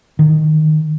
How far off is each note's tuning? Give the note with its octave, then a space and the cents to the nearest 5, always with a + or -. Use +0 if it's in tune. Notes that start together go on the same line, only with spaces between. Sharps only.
D#3 -10